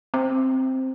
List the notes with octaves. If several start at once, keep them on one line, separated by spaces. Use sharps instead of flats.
C4